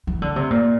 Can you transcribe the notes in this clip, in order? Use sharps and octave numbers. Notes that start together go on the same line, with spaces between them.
E3
D3
C3
A#2